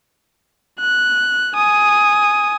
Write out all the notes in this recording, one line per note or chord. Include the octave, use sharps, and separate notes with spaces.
F#6
G#5 D#6